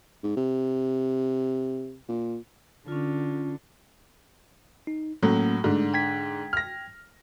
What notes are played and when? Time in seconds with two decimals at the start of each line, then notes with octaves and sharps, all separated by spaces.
0.23 G#2
0.36 C3
2.09 A#2
2.88 D3 C#4 F4
4.87 D#4
5.23 A2 F#3 A#3 C#4
5.64 G#2 D3 A3
5.94 G5 G#6 B6
6.53 F6 A#6